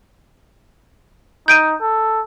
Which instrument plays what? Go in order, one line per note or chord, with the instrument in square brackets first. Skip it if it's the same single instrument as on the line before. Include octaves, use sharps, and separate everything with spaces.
[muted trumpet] D#4 [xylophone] G6 D7 D#7
[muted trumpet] A4